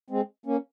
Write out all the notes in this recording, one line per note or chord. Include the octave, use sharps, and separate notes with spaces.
G#3 C4
A#3 C#4